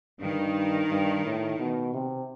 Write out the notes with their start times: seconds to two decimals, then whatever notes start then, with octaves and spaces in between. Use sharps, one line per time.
0.20 G2 D#3
0.90 G2
1.24 A2
1.59 B2
1.94 C3